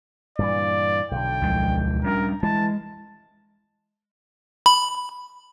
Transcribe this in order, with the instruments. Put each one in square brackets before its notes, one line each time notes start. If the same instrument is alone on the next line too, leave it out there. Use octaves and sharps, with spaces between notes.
[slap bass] G2 A#2 E3 [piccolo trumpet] D5
[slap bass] B1 D3 [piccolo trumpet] G5
[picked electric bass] D2 F3 G#3
[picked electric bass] G3 C#4 D4 [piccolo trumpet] A#4
[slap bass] E3 [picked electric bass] G#3 [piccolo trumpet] A5
[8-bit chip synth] B5